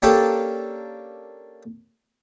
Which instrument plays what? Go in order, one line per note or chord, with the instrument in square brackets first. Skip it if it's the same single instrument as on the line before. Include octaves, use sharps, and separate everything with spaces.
[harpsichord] A#3 C#4 D4 G4 A4